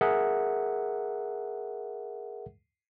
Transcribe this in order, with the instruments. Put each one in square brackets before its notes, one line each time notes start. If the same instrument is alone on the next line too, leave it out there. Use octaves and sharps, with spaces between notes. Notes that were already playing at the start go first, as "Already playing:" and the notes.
[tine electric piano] G#4 A#4 E5 F#5